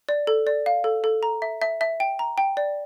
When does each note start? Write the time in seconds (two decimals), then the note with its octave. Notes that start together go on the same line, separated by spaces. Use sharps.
0.09 D5
0.27 A4
0.47 D5
0.66 F5
0.84 A4
1.04 A4
1.23 A#5
1.42 E5
1.62 E5
1.81 E5
2.00 G5
2.19 A#5
2.38 G5
2.57 D5